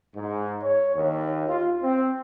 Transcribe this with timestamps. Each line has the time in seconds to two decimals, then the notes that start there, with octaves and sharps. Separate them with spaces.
0.16 G#2
0.63 C#5
0.95 D#2
1.47 F4
1.83 C4